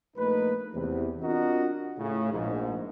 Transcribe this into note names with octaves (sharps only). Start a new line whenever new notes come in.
A#1 A3 A#3 D#4 B4
E2 C3
C4 D4 F4 F#4 A#4 D#5
A2 C#3
A#1 G#2